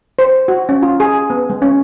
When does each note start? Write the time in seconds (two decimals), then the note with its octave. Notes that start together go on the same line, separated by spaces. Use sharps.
0.19 C5
0.48 F#4
0.69 C#4
0.83 F4
1.00 G#4
1.30 B3
1.50 G#3
1.62 C#4